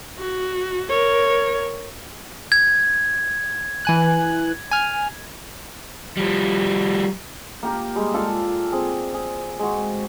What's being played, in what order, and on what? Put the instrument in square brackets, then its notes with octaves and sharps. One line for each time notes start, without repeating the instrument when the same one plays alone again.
[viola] F#4
A#4 C#5
[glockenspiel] G#6
[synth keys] E3 G#5 F#6
G#5 F6
[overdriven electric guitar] F3 G3
[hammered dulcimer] A#3 G4 A#4
G3 G#3
F4 A4 D5 F5
C4 G#4
G#4
G#3 F#4